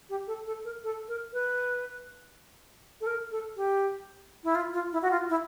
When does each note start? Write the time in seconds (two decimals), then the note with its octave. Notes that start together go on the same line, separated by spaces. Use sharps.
0.10 G4
0.27 A4
0.46 A4
0.65 A#4
0.84 A4
1.08 A#4
1.33 B4
3.01 A4
3.07 A#4
3.31 A4
3.56 G4
4.44 E4
4.55 F4
4.74 F4
4.93 E4
5.02 F#4
5.11 F4
5.30 E4